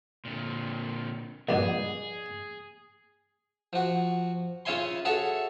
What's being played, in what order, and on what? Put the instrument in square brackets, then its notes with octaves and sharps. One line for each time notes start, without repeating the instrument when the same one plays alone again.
[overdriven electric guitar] A#2 D3
[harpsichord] A#1 G2 B2 [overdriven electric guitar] G#4
[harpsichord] F3 F#4
C#3 F4 C#5 E5 G#5 C6
F#4 G#4 A4 C#5 E5